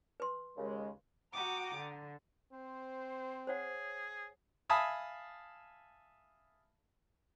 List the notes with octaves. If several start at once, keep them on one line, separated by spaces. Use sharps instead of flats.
B4 C6
D#2 C#3 G#3
F#4 F#5 G5 A#5 D6 D#6
D3
C4 C5
G#4 C5 C#5 F#5
E5 F5 G#5 A5 B5 D#6